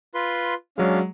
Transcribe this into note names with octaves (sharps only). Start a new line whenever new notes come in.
F4 B4 C6
F#3 G#3 C#4 D4 F5